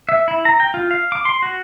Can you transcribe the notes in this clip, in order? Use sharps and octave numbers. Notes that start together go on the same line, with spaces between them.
E5
E4
A#5
G5
F4
F5
D6
C6
F#4